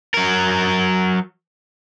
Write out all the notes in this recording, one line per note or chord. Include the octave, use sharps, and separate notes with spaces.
F#3 A#4